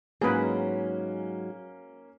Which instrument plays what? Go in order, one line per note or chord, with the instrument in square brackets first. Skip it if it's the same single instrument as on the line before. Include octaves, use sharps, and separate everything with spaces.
[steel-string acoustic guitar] G#2 F#3 [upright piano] A#3 C#4 [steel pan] G#4 B4